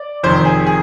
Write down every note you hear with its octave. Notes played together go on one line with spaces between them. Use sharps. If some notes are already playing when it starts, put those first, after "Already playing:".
Already playing: D5
F1 F2 C3 D#3 C5
G#4
G#4